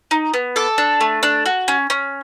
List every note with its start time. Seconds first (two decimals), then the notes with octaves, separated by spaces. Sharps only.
0.11 D#4
0.34 B3
0.56 A4 D6
0.78 D4
1.01 A3
1.23 D4
1.46 F#4
1.68 C#4
1.90 C#4